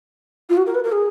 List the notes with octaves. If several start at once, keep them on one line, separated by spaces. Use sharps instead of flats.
F4
F#4
A#4
B4
A#4
G#4